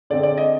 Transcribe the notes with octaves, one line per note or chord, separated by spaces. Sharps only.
D3 G#3 C4 D5
D5
D#5